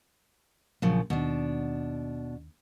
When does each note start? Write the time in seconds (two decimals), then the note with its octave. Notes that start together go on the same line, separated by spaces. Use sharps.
0.82 A#1 F#2 C#3 F3
1.10 D#2 B2 D4